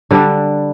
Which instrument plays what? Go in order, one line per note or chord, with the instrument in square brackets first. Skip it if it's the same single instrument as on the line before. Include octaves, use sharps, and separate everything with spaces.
[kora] D3 G3 D4